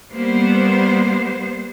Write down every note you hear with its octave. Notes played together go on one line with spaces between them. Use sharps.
G3 A#3 B3 C5